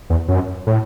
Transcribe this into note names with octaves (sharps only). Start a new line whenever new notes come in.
E2
F#2
A2